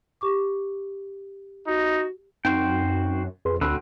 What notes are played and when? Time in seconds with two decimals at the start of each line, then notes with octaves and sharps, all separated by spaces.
0.21 G4 C#6 D6
1.67 D#4 F#4
2.45 F#2 C4 D#4 F#4 C5 G5
3.45 F2 G#4 B4 C6
3.61 D2 D3 C4 F#4 B5 E6 F#6